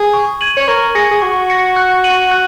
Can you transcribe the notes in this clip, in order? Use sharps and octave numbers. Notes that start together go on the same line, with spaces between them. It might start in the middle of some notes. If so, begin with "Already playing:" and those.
Already playing: G#4
C#6
G#6 D#7 F#7
C#5
A#4 C#6
G#4 A#6 C#7
G#4
F#4 C#6
A#6 C#7
F#6
D#7 F#7
F#6